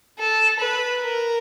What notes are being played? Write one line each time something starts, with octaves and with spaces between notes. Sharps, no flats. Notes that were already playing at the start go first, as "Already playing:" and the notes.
A4
B4
A#4